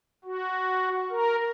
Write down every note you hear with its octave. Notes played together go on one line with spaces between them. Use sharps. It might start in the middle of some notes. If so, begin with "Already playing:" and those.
F#4
A#4